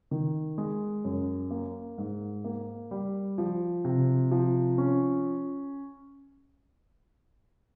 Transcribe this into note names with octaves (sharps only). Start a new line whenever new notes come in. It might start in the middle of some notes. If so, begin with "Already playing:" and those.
D#3
G#3
F#2
A#3
G#2
A#3
G3
F3
C3
F3
C#4